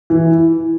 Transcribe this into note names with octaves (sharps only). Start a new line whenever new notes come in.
E3